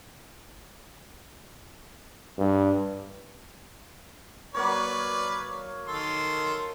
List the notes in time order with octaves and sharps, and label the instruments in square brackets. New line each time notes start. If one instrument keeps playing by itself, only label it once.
[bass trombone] G2
[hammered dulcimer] F#3 A#3 C#5 [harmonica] B4 D5
[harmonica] D#3 A4 C6